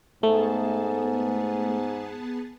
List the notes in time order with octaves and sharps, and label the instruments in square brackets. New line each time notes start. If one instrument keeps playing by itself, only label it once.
[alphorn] G#2 [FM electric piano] A3 [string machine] B3 G#4 A5